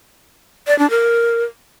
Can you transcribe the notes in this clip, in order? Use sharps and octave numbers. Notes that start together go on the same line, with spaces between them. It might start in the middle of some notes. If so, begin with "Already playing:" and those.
D5
D4
A#4